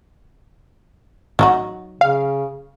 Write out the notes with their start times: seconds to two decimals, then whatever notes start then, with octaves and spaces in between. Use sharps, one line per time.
1.39 A1 F#3 D#4 F#4
2.01 C#3 F5